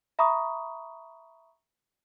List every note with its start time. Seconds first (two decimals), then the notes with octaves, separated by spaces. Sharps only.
0.19 E5 A#5 B5 C#6 D#6